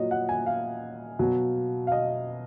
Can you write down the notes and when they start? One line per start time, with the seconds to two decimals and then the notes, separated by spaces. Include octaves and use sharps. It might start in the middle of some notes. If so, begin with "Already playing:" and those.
Already playing: A#2 F#3 C#5 D#5
0.11 F#5
0.29 G#5
0.46 F5
1.19 B2 F#3
1.87 F5
1.92 D#5